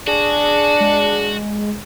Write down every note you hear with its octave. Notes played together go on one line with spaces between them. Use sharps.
D4 F#4 G#4
G#3